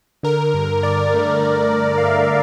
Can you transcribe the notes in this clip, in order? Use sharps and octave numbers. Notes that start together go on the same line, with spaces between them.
D3 A#4
G2
G2 D5
A3
D3
G2
F5
G2 E5